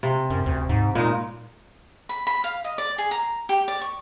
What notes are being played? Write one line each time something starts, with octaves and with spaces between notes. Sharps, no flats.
C3
F#2
D2
G#2
A#2 G#3 D#4
B5
B5
F5
D#5
D5
G#4
A#5
G4
D5
C#6